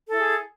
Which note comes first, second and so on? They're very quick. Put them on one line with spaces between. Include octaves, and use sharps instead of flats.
A4 E4 G#4